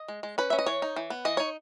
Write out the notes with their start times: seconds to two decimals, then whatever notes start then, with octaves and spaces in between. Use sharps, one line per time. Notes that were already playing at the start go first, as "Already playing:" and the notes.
Already playing: D#5
0.08 G#3
0.23 G#3
0.38 C#4 B4
0.50 C#4 E5
0.59 D#5
0.66 E3 C#5
0.82 D#4
0.96 E3
1.10 B3
1.25 E3 D#5
1.37 D#4 C#5